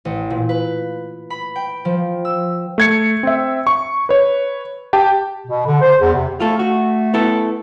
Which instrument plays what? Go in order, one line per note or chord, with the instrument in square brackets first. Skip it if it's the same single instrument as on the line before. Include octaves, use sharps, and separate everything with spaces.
[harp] A1
A#2
B4
B5
G5
F3
E6
[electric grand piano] A3 G#6 C#7
C4 E5
C#6
B4 C#5
G4 G5 A5
[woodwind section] B2
D3
C5
E2
C3
[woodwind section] A3 [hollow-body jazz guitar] F4 A4
[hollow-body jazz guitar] F#4
B3 E4 A4